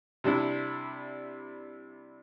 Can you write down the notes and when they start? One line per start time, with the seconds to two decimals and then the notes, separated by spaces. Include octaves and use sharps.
0.24 C3 G3 D4 E4